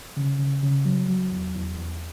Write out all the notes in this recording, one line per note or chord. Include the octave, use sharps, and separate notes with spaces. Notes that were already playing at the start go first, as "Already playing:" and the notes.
C#3
C#3
C#3
F#3
F#3
E2
E2
E2